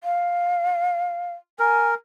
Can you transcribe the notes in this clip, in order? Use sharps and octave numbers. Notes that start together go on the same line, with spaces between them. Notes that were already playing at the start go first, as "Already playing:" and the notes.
F5
A#4 G#5